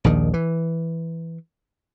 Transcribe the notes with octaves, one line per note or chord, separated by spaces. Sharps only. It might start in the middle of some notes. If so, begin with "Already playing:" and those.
A#1 D#2 D#3
E3